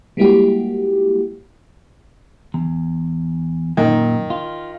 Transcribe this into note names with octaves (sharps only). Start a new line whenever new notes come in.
G3 G#3 A#3 E4 F#4 G4
E2
F#2 A#2 D#3
F4